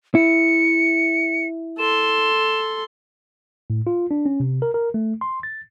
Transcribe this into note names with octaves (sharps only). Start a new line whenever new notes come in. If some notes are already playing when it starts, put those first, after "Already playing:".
E4 C#7
A4 C6 E7
A2
F4
D4
C#4
C3
A#4
A#4
A3
C6
A6